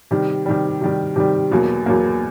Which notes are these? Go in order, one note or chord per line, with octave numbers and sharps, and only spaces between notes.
C3 D#3 G3
C3 D#3 G3
C3 D#3 G3
C3 D#3 G3
E2 B2 F#3 A#3
E2 B2 F#3 A#3